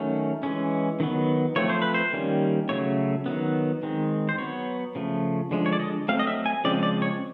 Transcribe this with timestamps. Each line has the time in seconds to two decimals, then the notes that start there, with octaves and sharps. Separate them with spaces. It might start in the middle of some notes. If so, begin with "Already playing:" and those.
Already playing: D#3 F#3 A3 C#4
0.43 E3 G#3 C#4
1.00 D#3 F#3 B3
1.56 F3 A3 C4 C#5
1.69 C5
1.82 B4
1.94 C5
2.13 D#3 G3 A#3 C#4
2.69 C#3 F#3 A3 C#5
3.26 D#3 F#3 B3
3.83 D#3 G#3 C4
4.29 C5
4.38 F#3 B3 C#5
4.95 C#3 F3 A3
5.51 D3 F3 G#3
5.66 C#5
5.73 D5
5.80 D#5
6.08 F#3 A3 C4 F5
6.19 D#5
6.27 E5
6.46 G#5
6.64 C#3 F3 G#3 C4 D5
6.83 D5
7.02 C#5